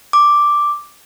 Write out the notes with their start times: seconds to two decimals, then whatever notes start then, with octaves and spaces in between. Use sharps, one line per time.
0.13 D6